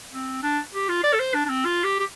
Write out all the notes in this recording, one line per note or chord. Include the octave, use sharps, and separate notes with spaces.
C4
D4
G4
F4
D5
A4
C5
D4
D4
C4
F4
G4
G4